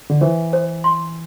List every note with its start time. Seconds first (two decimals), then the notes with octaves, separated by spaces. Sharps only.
0.10 D3
0.21 E3 C5
0.53 C5
0.84 C6